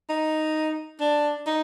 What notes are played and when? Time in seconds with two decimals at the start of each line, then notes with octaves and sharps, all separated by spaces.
0.09 D#4
1.01 D4
1.47 D#4